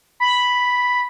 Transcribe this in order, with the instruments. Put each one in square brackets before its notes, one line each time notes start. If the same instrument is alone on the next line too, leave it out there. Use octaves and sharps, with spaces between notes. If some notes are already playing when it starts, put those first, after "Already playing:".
[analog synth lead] B5